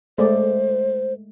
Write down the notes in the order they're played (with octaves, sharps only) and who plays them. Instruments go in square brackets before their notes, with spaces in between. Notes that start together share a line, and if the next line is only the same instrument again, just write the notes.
[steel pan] G#3 A3 D5 [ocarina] C5